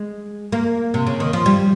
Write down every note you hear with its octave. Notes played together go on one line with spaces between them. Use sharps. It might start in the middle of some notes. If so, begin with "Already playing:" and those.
Already playing: G#3
A#3
C3
C#3
D#3
F3
G3